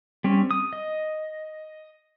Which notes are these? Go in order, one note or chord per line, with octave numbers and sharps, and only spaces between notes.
G3 C4 C#4
D#6
D#5